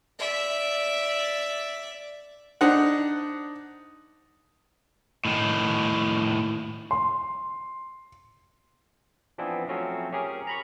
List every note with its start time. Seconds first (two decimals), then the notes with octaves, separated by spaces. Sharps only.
0.19 D5 E5
2.61 D4 D#4 C5 F#5
5.25 A2 D#3
6.91 C6
9.38 E3 F3 B3 C4 D4 E4
9.69 F3 F#3 A3 C4 C#4
10.12 C#4 G4 G#4 A#4
10.47 A#5 B5 C#6